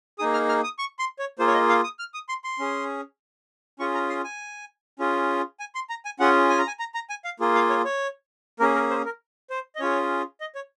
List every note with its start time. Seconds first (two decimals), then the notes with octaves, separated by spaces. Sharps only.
0.19 A#3 D#4 G#4 D#6
0.34 F6
0.49 F6
0.64 D#6
0.79 C#6
0.99 C6
1.19 C#5
1.39 A#3 F4 G#4 C5
1.47 C#5
1.54 D#5
1.69 F5
1.84 D#6
1.99 F6
2.14 D#6
2.29 C6
2.44 C6
2.59 C#4 G#4
3.79 C#4 F4 G#4 C#6
3.94 A#5
4.09 C6
4.24 G#5
4.99 C#4 F4 G#4
5.60 G#5
5.75 C6
5.89 A#5
6.05 G#5
6.20 C#4 F4 G#4 F#5
6.49 G#5
6.58 A#5
6.67 G#5
6.79 A#5
6.94 A#5
7.10 G#5
7.25 F5
7.40 A#3 F4 G#4
7.55 F5
7.70 C#5
7.85 C#5
8.59 A#3 C#4 G#4 A#4
8.74 A#4
8.90 C5
9.05 A#4
9.50 C5
9.75 D#5
9.80 C#4 F4 G#4 C#5
10.40 D#5
10.55 C#5